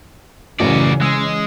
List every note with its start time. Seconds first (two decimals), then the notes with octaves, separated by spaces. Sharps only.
0.60 A1 F#2 C#3 E3 F#3 C#4 F#4 D5
1.01 G#3 E6